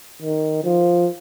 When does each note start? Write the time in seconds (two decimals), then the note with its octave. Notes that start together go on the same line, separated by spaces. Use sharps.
0.22 D#3
0.64 F3